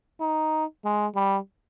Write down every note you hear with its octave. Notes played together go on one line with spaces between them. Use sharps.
D#4
G#3
G3